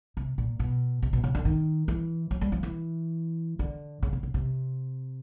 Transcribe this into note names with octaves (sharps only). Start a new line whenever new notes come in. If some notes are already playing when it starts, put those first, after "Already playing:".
C3
A#2
B2
C3
B2
C#3
D3
D#3
E3
F#3
G3
F3
E3
D3
C#3
C3
C#3
C3